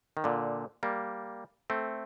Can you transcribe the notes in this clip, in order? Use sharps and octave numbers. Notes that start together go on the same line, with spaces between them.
D#3
A#2 D3
G3 A#3
A3 C4